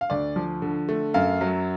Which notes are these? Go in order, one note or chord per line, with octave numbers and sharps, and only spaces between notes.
F5
D2 D5
F3
D3
A3
F#2 F5
F#3